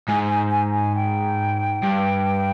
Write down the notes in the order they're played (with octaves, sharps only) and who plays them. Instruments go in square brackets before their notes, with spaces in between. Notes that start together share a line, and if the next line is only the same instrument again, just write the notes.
[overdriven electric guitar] G#2 [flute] G#5
[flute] G#5
G#5
G#5
G5
[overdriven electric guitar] G2